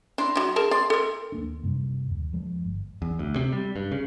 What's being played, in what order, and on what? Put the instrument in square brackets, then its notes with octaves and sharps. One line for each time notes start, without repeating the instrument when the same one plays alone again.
[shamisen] D4 [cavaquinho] E4 A#5 C6
[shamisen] F#3 D4
G#4 A#4 A5
[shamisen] D5 [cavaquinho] C6
[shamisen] A4 A#4
[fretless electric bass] D#2 A#3 D4
F#2 C3 G3
D#2
E2 F3 G#3
G1
[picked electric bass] E2
D2
C3
G3
G2
C#3